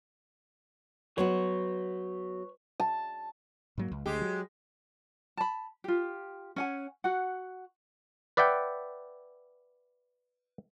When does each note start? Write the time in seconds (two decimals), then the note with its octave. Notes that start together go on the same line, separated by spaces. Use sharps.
1.18 F#3 B3 F#4 B4 C#5
2.80 A5
3.78 G#2 F#3 A#3
3.92 C#2
4.06 D2 G#3 G4
4.21 F#3
5.37 A5 B5
5.84 F4 G4
6.56 C#4 F#5 G#5
7.04 F#4 F#5
8.37 B4 D5 E5 F#5 G5